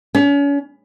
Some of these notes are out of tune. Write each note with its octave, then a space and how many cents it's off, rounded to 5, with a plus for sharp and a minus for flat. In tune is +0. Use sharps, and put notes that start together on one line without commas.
C#4 +35